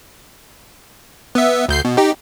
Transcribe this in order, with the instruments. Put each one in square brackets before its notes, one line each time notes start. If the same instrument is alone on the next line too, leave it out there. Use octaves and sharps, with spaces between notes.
[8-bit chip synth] B3 E5
D2 G6 C7
B2
D#4 G4